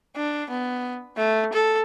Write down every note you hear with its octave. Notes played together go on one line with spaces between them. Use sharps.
D4
B3
A3
A4